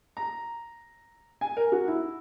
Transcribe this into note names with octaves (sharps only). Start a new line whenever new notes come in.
A#5
G#5
A#4
F#4
E4